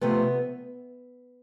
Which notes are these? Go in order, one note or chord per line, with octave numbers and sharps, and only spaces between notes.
C3 F3 A3 B3